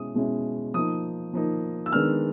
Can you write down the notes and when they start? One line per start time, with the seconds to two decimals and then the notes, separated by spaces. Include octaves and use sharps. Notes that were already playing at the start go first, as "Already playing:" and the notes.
Already playing: B2 G#3 C#4 E4 D#6
0.14 B2 G#3 C#4 E4
0.74 F3 A#3 D#4 D#6
1.33 F3 A#3 D#4
1.86 E6
1.92 D#3 G#3 B3 D4 F6